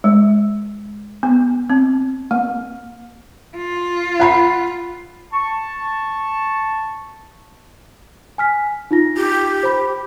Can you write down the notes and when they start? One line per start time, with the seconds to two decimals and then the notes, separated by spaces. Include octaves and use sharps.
0.04 G#3
1.23 B3
1.70 C4
2.31 A#3
3.57 F4
4.20 F#5 B5 C7
5.33 A5 C#6
8.38 G#5 F6 B6
8.91 D#4 F4 A#6
9.17 G4
9.63 C5 B5